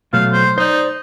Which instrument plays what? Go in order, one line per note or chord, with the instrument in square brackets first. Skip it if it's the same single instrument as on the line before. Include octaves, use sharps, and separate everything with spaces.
[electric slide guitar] B2 F#3 A3 [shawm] F5
[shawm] C5
[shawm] D#4 [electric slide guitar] C5 D5